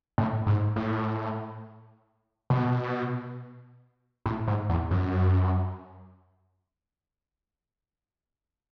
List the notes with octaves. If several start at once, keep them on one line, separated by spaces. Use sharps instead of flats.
A2
G#2
A2
B2
A2
G#2
E2
F#2